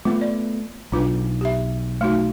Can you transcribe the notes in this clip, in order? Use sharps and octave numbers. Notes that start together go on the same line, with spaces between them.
A3 B3 F4
D5
B1 D4 F4 B4
G4 E5
A3 D#4 F#4